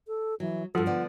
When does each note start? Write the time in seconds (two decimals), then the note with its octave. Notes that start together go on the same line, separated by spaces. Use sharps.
0.07 A4
0.40 E3 F#3
0.75 G2 F3 F#4 A4 F#5
0.87 D3 B3 D5 F#5